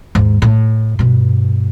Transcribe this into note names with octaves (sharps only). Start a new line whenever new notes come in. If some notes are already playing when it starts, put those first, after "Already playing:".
D#2 G#2
A2
G2 B2